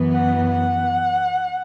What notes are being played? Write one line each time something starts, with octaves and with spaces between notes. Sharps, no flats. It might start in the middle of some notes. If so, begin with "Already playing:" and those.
Already playing: F#2 E3 B3
F#5
F#5